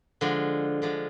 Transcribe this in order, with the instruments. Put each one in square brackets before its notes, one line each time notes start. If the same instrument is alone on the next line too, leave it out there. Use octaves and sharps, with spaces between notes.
[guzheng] D3 F3 G#3
D3 F3 G#3